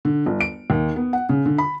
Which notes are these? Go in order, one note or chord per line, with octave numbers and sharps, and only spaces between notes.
D3
G1
D7
D#2
B3
F#5
C#3
D3
B5